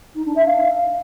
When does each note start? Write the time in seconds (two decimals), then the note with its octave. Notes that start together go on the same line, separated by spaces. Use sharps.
0.15 D#4
0.25 D4
0.35 E5
0.46 F5